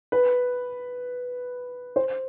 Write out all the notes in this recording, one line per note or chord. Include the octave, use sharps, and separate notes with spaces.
B4
C5